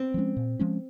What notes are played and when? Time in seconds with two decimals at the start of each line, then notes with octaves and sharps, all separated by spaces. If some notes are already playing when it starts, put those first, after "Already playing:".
Already playing: C4
0.14 F3 G#3 C#4
0.37 A#2
0.59 F3 G#3 C#4